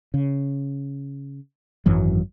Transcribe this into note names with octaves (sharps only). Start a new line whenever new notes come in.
C#3
G#1 F#2 E3 F#3